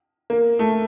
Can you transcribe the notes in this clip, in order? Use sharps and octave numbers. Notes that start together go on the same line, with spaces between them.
A#3
A3